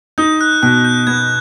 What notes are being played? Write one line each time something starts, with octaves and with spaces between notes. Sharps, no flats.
D#4 G6
F#6
B2 F#6
G6
B3 G#6